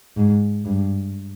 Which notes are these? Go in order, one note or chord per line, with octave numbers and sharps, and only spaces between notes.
G#2
G2